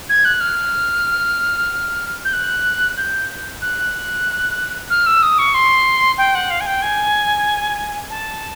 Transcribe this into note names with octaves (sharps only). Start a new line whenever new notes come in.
G#6
F#6
F6
G6
F#6
G6
F#6
F6
E6
D#6
C#6
C6
G5
F#5
F5
G#5
G5
G#5
A5